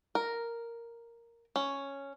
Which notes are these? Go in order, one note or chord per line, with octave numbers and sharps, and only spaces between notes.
A#4
C#4